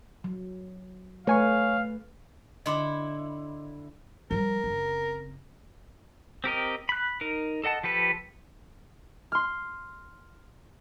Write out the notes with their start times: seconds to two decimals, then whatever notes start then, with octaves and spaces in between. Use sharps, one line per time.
0.24 F#3
1.27 A3 B4 C#5 F5 G#5 C#6
2.66 D3 E4 D#5 C6 D6
4.31 F3 G3 A#4
4.64 F#1 C4
6.44 C4 G4 A#4 D#5
6.89 B5 F#6
7.21 D#4 A#4
7.64 A4 D#5 F#5 A5
7.83 F3 G4 A4 B4
9.32 C6 F6